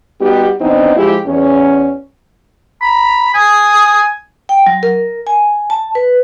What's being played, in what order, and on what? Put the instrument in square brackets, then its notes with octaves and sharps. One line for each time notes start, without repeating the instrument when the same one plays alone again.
[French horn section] G3 B3 D#4 F#4 G4
E3 B3 C4 D4 D#4
F3 G#3 E4 F4 G4
E2 C#4
[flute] A#5 [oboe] B5
[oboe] G#5 [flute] D#6
[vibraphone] G5
F#3
A#4
G#5
A5
B4